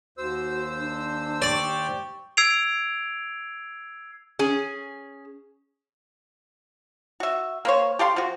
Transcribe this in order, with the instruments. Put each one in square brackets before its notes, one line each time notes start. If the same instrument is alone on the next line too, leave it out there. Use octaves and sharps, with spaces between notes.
[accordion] D#2 C5 E6 [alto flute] F#4
[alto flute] D4
[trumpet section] G4 C#6 [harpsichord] D5
[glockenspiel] E6 G#6 C7 D7 F7
[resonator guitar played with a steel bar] C#4 G#4
[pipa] F#4 E5
A#3 C5 C#5
G4 A4 F5 C6
F3 F#4